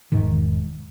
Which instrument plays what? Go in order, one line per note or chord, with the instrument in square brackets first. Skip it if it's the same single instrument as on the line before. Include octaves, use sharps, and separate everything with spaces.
[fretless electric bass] E1 G#2 D#3